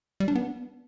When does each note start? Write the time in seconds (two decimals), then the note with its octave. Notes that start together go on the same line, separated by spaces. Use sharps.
0.20 G3
0.28 D4
0.35 B3